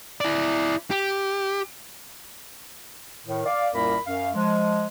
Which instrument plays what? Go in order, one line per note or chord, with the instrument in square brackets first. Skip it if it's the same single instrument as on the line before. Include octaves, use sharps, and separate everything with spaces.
[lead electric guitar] E4 D5
G4
[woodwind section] A2 D#3
D5 F5
C2 F#2 A#2 A#3 A#4 B5
F#2 F5
F3 G#3